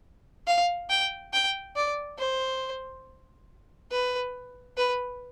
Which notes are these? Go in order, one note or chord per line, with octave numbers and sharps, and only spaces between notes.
F5
G5
G5
D5
C5
B4
B4